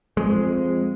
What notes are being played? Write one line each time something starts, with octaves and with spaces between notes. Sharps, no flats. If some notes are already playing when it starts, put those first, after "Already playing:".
F2 G#3